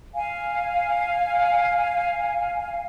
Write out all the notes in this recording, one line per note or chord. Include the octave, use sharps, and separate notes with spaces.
F5 G#5